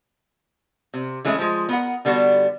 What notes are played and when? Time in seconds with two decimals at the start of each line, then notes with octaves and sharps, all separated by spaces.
0.94 C3
1.25 E3 G#3 A3 C#4 D#4 E4
1.39 F3 G#3
1.69 B3 A#4 F#5
2.05 D3 G3 B3 D4 F#4